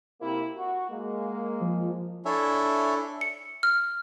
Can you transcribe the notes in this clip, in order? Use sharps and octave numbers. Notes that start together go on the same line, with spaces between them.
C3 A#3 E4
F#4
G#3 A#3
F3
D4 E4 A4 C#5 E5 G#5
C#7
F6